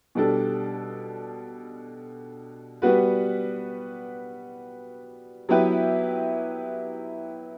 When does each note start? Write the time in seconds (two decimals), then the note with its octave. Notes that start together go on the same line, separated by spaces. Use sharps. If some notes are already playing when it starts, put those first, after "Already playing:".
0.15 B2 G3 D4 A4
2.82 G3 B3 F#4 B4
5.49 F#3 B3 E4 G4 B4